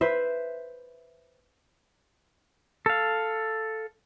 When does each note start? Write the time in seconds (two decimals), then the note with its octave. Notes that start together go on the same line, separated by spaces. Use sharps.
0.01 B4 C5 E5
2.86 A4 F5